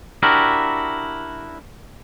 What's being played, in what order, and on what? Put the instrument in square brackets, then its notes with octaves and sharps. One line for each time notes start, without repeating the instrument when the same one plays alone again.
[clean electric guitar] D4 E4 F#4 G4 A#4